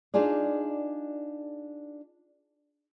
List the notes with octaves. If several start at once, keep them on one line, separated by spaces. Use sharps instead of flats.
D4 D#4 F4 G#4 D5